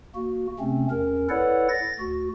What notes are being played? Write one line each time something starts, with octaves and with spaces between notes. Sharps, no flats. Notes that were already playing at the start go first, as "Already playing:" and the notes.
A#3 F#4
C3 A3 C4 C#4
E2 C#4 A#4
E4 A4 B4 C#5 D5 F#5
A6 A#6
D2 F#4